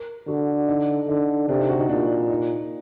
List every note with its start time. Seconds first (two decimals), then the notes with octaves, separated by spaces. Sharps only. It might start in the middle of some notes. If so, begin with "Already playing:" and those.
Already playing: A#4
0.28 D3 F#4
0.68 D#4
1.09 D3 D#4
1.49 C3 D4
1.59 D#4
1.69 F#4
1.79 D#4
1.89 A#2 D4
2.30 D#4